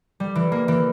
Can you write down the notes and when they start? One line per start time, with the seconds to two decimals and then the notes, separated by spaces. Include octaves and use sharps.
0.20 G3
0.35 E3
0.52 A#3
0.68 E3